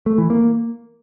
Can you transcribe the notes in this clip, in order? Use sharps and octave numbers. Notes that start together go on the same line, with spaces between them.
A3
E3
A#3